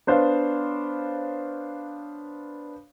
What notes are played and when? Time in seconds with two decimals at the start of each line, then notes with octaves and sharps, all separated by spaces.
0.07 B3 D4 C5 C#5 F5